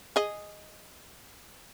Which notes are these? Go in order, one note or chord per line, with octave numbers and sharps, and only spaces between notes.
G#4 D#5